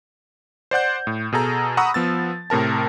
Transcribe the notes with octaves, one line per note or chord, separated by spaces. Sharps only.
C5 D5 F#5 G6
A2
B2 G#4 A4 A#5
F#5 A#5 B5 C#6 D#6 E6
F3 B3 E6 A6
A2 C3 A#4 A5